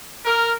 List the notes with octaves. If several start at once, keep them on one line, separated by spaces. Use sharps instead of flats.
A#4